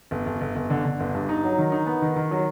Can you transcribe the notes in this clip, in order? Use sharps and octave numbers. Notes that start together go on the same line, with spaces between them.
G1
G1
G1
G1
D3
D3
G1
G2
D#4
F#3
D#3
D#4
B3
D#3
D#3
F#3